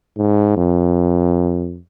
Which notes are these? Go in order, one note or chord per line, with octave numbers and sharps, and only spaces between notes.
G#2
F2